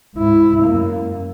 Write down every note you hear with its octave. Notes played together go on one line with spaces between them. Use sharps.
G#2 E4
F#2 A#3